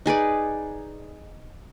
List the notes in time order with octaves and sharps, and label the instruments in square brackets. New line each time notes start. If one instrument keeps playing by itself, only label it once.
[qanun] D#4 G#4 B4 D5